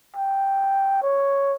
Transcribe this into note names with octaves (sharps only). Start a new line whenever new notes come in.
G5
C#5